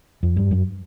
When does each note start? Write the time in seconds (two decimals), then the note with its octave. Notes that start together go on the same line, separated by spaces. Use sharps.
0.23 F2
0.36 G2
0.51 F#2